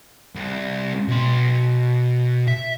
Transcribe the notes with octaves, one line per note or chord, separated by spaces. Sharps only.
C2
B2 C6
E5